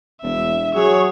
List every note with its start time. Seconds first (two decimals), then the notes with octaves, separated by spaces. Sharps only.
0.22 E1 E5
0.75 F#3 G#4 C#5